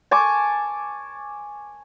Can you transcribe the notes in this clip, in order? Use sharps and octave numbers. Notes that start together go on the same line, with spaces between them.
G#5 A5 C#6 D6